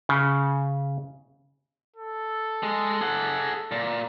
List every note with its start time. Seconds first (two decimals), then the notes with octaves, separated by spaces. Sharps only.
0.09 C#3
1.96 A4
2.63 G#3
3.01 G#4 F#5
3.72 A#2